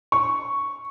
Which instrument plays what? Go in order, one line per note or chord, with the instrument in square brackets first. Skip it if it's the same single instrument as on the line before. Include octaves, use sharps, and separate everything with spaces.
[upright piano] C#6